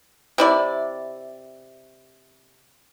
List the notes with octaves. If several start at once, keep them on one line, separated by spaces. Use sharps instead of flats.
C3 E4 D5